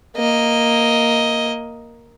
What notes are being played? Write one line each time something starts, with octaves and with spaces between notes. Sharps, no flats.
A#3 D#5